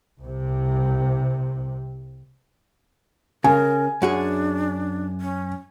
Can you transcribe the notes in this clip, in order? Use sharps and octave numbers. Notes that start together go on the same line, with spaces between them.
C2 C3
C#3 A#4 G#5
F#2 D4 F#4 G#4
C#4